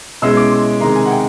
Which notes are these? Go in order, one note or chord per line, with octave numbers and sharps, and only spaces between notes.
B2 G#3 C#4 E4 E6
D6
C6
C3 D#3 G#3 A#5
G#5
F#5
G5